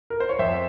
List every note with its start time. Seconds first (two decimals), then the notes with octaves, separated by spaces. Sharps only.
0.10 A#4
0.20 C5
0.29 C#5
0.39 F2 C5 E5